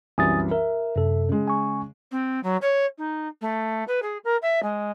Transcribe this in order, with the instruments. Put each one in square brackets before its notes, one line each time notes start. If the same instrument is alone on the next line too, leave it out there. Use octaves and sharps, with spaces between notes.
[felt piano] C2 F#2 E3 [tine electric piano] G#5 D#6 A6
[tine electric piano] A#4 [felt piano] E5
[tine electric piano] F#2 C3 A4
[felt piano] C#3 G#3
[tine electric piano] G#5 C#6
[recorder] C4
F#3
C#5
D#4
A3
B4
G#4
A#4
E5
G#3